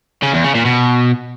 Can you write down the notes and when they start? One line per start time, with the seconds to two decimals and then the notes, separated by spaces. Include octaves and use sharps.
0.22 C#3
0.33 E2
0.44 C#3
0.55 A#2
0.65 B2